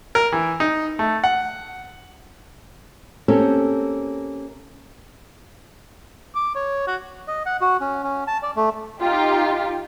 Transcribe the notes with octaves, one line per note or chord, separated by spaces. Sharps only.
A#4
E3
D#4
A3
F#5
A#3 C4 C#4 G4 A4
D6
C#5
F#4
D#5
F#5
F#4
C#4
C#4
A5
D5
A3
D#4 F4 G4